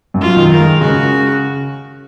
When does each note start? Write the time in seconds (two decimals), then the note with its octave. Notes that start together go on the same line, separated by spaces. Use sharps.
0.14 F#2
0.22 F4
0.36 D#3
0.52 A#4
0.59 G#3
0.81 C#3 F#4